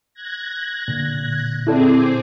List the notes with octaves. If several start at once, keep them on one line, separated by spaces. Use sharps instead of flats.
F#6 G#6 A#6
A#2 D3
C4 E4 G#4 A4 D5 D6